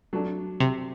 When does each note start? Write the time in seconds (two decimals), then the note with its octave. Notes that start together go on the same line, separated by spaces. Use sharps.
0.13 F#3 A3 D4
0.60 C3